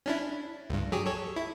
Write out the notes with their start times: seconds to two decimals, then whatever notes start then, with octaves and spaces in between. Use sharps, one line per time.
0.06 C#4 D4 E4
0.70 C#2 G2
0.92 F#3 G4 G#4
1.06 A4 C#5
1.36 E4